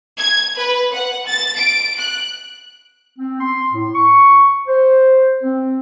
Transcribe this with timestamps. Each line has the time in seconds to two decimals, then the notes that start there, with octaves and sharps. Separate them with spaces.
0.18 G#6
0.57 B4
0.94 F#5
1.27 A6
1.57 D7
1.98 F#6
3.19 C4
3.41 C6
3.72 A2
3.94 C#6
4.68 C5
5.43 C4